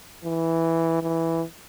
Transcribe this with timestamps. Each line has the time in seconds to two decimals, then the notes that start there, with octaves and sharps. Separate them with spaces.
0.25 E3
1.03 E3